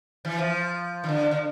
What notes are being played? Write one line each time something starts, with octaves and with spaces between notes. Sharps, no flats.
E3
F3
E3
D3
D3